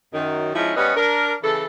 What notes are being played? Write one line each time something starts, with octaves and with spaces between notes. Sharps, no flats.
F#2 D#3
F3 G#3 C#4 D#4 E4
G3 B3 C#4 B4 D#5
D4 A#4
C#3 E3 A4